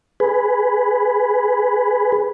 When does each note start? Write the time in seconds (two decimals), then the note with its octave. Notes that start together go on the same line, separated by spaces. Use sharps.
0.20 G#4 B4